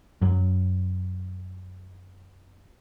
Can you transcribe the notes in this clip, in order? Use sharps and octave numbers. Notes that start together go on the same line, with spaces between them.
F#2 F#3